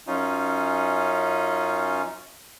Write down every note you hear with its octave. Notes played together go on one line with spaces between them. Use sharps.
F#2 C#4 D#4 F4